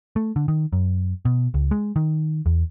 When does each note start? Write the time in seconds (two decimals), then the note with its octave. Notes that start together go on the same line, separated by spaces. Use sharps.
0.16 A3
0.36 D3
0.48 D#3
0.73 F#2
1.25 B2
1.54 C#2
1.71 G#3
1.96 D#3
2.46 E2